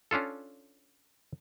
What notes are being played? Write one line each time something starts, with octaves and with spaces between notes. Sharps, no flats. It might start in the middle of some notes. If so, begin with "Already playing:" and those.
C#4 D4 F4 A4